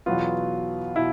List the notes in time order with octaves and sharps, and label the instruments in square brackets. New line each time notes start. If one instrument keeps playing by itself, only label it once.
[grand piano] E2 B2 F#3 B3 F4
B2 E4